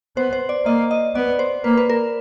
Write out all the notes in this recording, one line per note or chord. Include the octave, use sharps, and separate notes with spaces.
B3 C5
C5
D5
A#3 D#5
D#5
B3 D5
C5
A#3 B4
B4
A#4